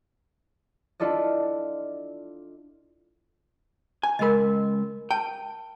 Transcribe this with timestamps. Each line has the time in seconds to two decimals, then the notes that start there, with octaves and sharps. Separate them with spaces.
1.00 D4 E4 F4 A4 D5 D#5
4.03 G#5
4.19 C#2 G#3 A#4 D#5 B5
5.11 G5 A5